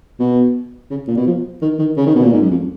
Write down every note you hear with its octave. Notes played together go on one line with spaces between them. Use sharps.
B2
C#3
A#2
B2
F3
D#3
D#3
C#3
D#3
B2
A#2
G#2
F#2
F2